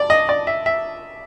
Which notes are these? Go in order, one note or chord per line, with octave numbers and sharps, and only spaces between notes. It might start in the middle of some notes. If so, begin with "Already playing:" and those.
Already playing: D5
D#5
D5
E5
E5